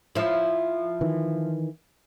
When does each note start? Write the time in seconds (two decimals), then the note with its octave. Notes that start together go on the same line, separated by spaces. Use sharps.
0.15 F3 E4
1.01 D#3 E3